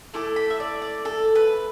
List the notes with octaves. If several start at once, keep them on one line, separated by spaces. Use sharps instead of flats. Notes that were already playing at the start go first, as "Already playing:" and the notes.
A3 E4 A4 D6
B5
E5
D5
D5
A4
B4